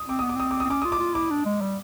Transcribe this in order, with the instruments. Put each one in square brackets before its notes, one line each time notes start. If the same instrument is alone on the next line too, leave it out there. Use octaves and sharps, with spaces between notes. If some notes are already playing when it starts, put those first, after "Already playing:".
Already playing: [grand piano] D#6
[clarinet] C4 [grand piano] D6
[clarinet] B3 [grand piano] D#6
[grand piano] D6
[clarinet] C4 [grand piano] D#6
[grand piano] D6
[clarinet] C4 [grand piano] D#6
[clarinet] C#4 [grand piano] D6
[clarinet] F4 [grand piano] D#6
[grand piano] D6
[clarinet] F4
[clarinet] E4 [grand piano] D6
[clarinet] D4
G#3
G3